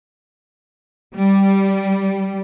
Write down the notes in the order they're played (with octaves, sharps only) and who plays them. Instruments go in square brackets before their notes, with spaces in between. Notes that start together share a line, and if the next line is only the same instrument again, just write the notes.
[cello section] G3